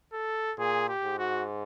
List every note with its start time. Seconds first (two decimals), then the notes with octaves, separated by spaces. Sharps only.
0.13 A4
0.58 A#2 G#4
0.89 G4
1.04 G#2
1.18 F#4